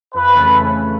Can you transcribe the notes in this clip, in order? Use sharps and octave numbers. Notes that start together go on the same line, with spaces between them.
F2 B4
C#3 E3 A3 C#4